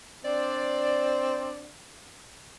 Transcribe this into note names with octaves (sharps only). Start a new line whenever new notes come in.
C4 D4 C5 D5